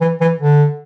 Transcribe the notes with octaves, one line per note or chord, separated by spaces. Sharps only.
E3
E3
D3